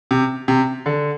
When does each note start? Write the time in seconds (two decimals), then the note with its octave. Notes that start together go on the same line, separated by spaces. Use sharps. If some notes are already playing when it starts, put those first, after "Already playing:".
0.11 C3
0.48 C3
0.86 D3